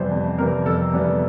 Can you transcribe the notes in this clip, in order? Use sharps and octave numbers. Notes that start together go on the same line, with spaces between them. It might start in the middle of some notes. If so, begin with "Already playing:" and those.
Already playing: F2 C3 E3 G3 B3 C5
F2
C3 E3 G3 B3 A#4
F2 A4
C3 E3 G3 B3